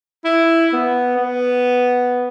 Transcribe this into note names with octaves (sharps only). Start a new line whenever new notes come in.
E4
B3
B3